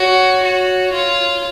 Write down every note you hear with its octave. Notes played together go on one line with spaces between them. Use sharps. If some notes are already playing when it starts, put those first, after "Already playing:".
Already playing: F#4 C#5
F#4
F4